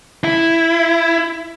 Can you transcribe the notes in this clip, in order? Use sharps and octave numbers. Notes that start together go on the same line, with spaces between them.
E4